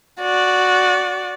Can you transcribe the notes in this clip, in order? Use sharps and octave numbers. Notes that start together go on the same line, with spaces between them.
F#4 D5